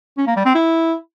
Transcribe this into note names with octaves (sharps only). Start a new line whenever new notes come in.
C#4
A#3
G3
C4
E4